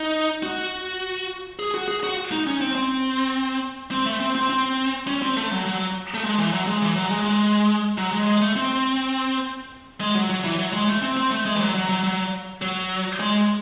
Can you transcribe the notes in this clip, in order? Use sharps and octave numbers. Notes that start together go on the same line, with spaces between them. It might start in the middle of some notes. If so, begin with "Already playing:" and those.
Already playing: D#4
F#4
G#4
F#4
G#4
F#4
D#4
C#4
C4
C4
C4
A3
C4
C4
C4
C#4
C4
A3
F#3
F#3
A3
G#3
E3
F#3
G#3
E3
F#3
G#3
G#3
F#3
G#3
G#3
A3
C4
G#3
F#3
F#3
E3
F#3
G#3
A3
C4
C4
A3
G#3
E3
F#3
F#3
F#3
F#3
F#3
G#3